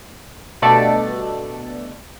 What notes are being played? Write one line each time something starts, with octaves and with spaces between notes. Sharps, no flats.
G2 B2 A3 A4 D5